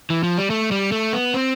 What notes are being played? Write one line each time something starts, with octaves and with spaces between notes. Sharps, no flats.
E3
F3
G3
A3
G3
A3
B3
C4